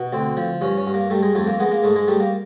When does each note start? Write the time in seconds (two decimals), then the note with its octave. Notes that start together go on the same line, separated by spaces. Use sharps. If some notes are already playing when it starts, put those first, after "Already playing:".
Already playing: B2
0.13 D2 C4
0.37 F3
0.61 G2 C#4
0.77 C#4
0.87 G2
0.94 A#3
1.10 G3 A3
1.23 G#3
1.35 F2 A3
1.47 A#3
1.59 G#3 B3
1.71 A#3
1.84 G#2 A3
1.96 G#3
2.08 G3 A3
2.20 A#3